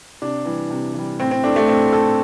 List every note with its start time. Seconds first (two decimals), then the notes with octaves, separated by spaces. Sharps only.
0.22 C3 D4
0.45 E3 G3
0.70 C3
0.94 E3 G3
1.19 A2 C4
1.31 C4
1.44 A3 D4
1.56 A3
1.68 A2 C4
1.93 A3 A4